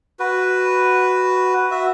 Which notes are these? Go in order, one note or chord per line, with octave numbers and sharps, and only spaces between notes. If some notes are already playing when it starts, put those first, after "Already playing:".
F#4 B4
F#4 E5